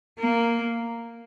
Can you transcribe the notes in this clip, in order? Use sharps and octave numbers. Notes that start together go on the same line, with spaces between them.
A#3